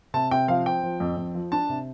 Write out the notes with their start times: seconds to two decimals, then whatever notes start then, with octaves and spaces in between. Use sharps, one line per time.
0.14 C3 A5
0.31 C3 G5
0.48 F3 F5
0.66 C4 G5
0.83 F3
1.00 F2
1.17 F2
1.35 F3
1.52 D4 A5
1.69 C3